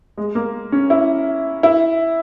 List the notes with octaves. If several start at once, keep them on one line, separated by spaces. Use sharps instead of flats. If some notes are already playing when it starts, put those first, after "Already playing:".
G#3
A#3
C#4
E4
E4